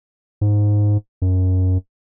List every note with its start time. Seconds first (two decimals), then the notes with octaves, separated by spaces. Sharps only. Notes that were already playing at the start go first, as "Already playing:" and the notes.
0.41 G#2
1.22 F#2